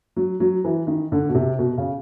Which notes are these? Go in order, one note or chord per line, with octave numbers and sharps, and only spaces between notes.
F#3
F#3
E3
D#3
D3
B2
C3
B2
C#3